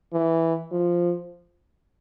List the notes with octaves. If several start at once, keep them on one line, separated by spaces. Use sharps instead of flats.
E3
F3